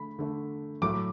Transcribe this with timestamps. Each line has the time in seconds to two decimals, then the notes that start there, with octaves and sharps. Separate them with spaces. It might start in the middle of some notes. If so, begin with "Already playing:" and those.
Already playing: D3 A3 B5
0.19 D3 A3
0.82 A2 F#3 A3 D6